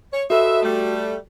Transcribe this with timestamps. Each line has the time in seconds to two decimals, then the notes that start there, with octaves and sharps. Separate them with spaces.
0.13 C#5
0.30 F#4 A4 B4 D#5 E5
0.63 G3 A3